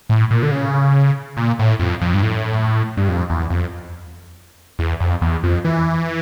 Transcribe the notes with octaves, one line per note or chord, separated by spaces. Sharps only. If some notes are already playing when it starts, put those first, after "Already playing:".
A2
A#2
D3
C#3
A#2
A2
F2
F2
G2
A2
G2
F2
E2
F2
E2
F2
E2
F2
E3